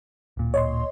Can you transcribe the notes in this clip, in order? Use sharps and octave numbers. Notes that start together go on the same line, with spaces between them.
D1 A#2
C#5 D#5 C6